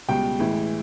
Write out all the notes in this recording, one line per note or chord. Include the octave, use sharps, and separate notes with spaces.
C#2 B2 G3 G5
A1 A2 E3 G#3